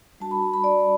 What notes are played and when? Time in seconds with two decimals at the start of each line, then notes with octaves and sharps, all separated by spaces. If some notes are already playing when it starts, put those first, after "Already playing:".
0.20 G3 D4 F#4 A5
0.31 B5
0.43 B5
0.54 B5
0.64 D5